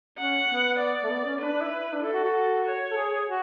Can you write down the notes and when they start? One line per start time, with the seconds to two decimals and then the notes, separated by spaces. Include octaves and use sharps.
0.18 C#4 F#5
0.49 B3
0.79 D5
1.04 A3
1.10 B3
1.25 C#4
1.41 D4 B4
1.52 D4
1.61 E4
1.93 D4
2.02 E4 A4
2.13 F#4
2.24 F#4
2.65 C#5
2.91 A4
2.96 G#4
3.11 G#4
3.27 F#4